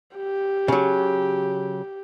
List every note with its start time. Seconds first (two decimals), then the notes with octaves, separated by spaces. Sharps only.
0.16 G4
0.68 C#3 F#3